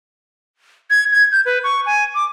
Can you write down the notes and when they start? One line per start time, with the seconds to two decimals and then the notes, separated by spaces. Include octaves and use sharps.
0.90 G#6
1.12 G#6
1.32 G6
1.46 B4
1.64 C#6
1.86 G#5
2.15 D6